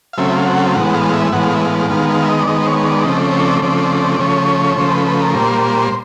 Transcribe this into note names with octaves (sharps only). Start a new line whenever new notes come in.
F5
C#3 F#3 A3 C4 E5
F5
F#5
F5
A2 E3 G#3 B3 F#5
F#5
F5
E5
A2 E3 G#3 B3 F#5
F5
E5
F5
D#3 G#3 B3 F5
F5
E5
D#5
D5
D#3 G#3 B3 D#5
C5
C#5
D5
C#3 F3 A3 C4 D#5
D5
C#5
D5
C#3 F3 A3 C4 D5
D5
C#3 F3 A3 C#5
C#3 F3 A3 C5
B4
B4
A#4
A#2 G3 A#3 C5